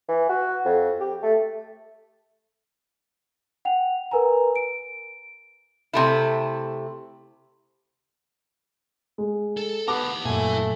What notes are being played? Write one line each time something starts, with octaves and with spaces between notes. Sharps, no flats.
E3
F#4
F2
G4
A3
F#5 G5 F7
A#4 B4 G#5 A#5
D7
C3 A3 E4
G#3
A4
B3 G4 A#4 F#5 A5 D6
F#2 A#2 A3 E4 G#5